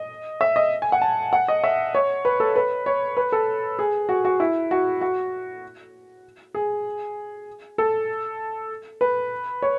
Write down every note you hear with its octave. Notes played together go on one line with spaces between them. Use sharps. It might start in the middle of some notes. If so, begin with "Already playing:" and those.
Already playing: D#5
E5
D#5
G#5
F#5
A5
F#5
D#5
E5
C#5
B4
A4
B4
C#5
B4
A4
G#4
F#4
F#4
E4
F#4
F#4
G#4
A4
B4
C#5